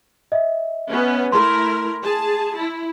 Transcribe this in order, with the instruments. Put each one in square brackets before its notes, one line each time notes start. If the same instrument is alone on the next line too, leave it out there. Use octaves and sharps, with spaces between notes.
[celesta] D#5 E5
[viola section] B3 C#4
[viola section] A3 E4 A#4 [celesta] C6
[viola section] G#4 A5
E4